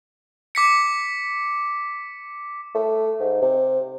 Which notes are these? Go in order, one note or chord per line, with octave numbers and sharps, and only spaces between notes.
D6 B6 C#7
A3
G#2
C3